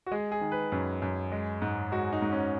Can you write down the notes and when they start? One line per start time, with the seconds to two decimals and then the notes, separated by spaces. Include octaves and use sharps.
0.06 F#4
0.12 G#3 G#4
0.32 G#4
0.41 D#3
0.52 B4
0.72 F#2
1.02 F#2
1.32 G#3
1.62 G#2
1.92 G#3 F#4
2.13 D#4
2.22 G#2
2.32 C#4